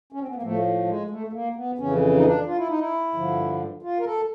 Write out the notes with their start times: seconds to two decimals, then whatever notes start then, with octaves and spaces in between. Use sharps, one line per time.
0.12 C#4
0.20 C4
0.28 B3
0.35 A#3
0.42 A2 F3 A3
0.87 G#3
1.10 A3
1.27 A3
1.33 A#3
1.56 B3
1.78 F2 C#3 E3 C#4
2.16 D#4
2.24 D4
2.46 F4
2.57 E4
2.69 D#4
2.78 E4
3.14 G2 D3 F3
3.82 F4
3.99 A#4
4.06 A4